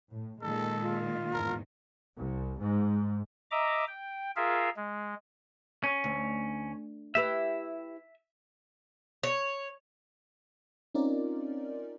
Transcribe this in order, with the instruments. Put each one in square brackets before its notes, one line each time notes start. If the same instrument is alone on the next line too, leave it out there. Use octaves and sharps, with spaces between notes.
[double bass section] A2
[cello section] A#2 D#3 [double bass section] G#3 [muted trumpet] A4
[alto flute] F4
[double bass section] E2 G#2 [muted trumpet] A#4
[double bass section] C2
G#2
[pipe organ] D#5 E5 A#5 D6
G5
F4 G#4 A#4 E5 F5
G#3
[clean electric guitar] C#4
[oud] D2
[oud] E4 G4 B4 [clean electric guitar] E5
[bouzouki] C#5
[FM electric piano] C4 C#4 D#4 F4 A#4 D5